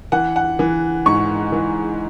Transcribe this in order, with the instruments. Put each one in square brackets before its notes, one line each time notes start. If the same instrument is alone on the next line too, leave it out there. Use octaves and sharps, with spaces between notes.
[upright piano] E3 F#5
F#5
E3
G#2 C#6
E3